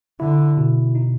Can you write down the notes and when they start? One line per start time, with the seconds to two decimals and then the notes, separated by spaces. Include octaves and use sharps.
0.20 D3 E4
0.57 B2
0.95 D#4